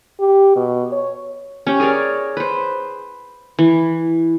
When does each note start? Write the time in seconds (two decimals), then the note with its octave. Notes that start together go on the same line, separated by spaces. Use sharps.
0.20 G4
0.56 B2
0.92 C#5
1.67 C#4 G4
1.80 G#4 A#4 C#5 D5
2.37 B4 C5
3.59 E3